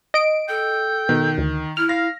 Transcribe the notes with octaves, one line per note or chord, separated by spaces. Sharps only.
D#5 D7
A4 G5
B2 D#3
D2
E4 F6
F5 A#6